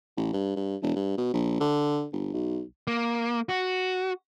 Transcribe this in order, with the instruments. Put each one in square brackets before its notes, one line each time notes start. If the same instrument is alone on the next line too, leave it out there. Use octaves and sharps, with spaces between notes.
[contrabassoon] A1
G2
G2
E1
G2
B2
A#1
D3
G1
B1
[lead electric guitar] A#3
F#4